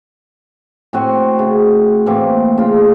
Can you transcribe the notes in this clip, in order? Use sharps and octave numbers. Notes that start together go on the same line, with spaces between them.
A2 C4 F#4 G#5
C#3
A2 E3 A#3 C4
C#3 F4